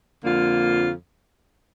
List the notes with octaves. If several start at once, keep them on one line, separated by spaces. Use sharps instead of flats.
F2 D3 F3 A#3 F4